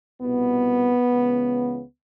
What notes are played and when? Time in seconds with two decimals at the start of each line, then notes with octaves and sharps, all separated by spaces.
0.20 C2 B2 B3
1.11 C#2 C#3 E3